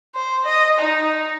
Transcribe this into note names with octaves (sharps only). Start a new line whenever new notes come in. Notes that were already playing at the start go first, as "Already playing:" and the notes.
C5
D#5
D#4